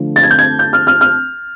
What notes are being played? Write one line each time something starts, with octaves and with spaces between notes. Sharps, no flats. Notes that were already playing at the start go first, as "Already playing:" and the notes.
Already playing: D3 F3 A3
A6
G#6
G6
G#6
G6
F6
F6
F6